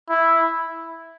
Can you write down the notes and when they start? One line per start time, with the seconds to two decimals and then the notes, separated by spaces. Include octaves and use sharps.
0.09 E4